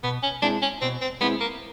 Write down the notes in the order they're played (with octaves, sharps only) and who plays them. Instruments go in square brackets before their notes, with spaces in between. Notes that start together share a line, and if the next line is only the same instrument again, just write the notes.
[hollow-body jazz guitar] B2 [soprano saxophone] B3
[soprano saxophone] C#4
[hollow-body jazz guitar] G#3 C4 E4 [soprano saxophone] D4
[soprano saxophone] C#4
[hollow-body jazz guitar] B2 [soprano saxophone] C4
[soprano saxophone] C4
[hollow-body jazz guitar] G#3 C4 E4 [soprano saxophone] B3
[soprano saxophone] A#3